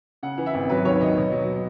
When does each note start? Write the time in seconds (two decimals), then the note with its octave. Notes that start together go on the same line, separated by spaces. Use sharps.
0.23 C#3 F#5
0.38 E3
0.46 E5
0.54 G#1
0.70 F#3 B4
0.85 D#2 C#5
1.01 D#2 D#5
1.17 B2
1.32 F#3